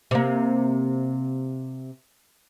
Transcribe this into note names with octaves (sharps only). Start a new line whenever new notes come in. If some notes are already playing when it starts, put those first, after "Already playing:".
C3 A#3